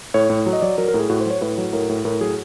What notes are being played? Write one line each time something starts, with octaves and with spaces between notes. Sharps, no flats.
A2 C#5
A2
F#3
D#5
F#3 D5
F#3 A#4
A#4
A2
G#4
A2 F#4
C5
F#3
C#5
A2 B4
F#3
A2 A#4
A2
A2 A#4
F#3 G#4